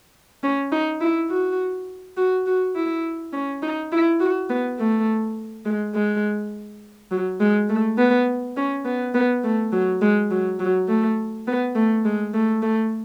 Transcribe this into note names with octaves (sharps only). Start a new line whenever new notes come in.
C#4
D#4
E4
F#4
F#4
F#4
E4
C#4
D#4
E4
F#4
B3
A3
G#3
G#3
F#3
G#3
A3
B3
C#4
B3
B3
A3
F#3
G#3
F#3
F#3
A3
B3
A3
G#3
A3
A3